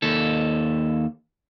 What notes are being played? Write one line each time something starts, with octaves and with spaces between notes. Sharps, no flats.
D#2 A4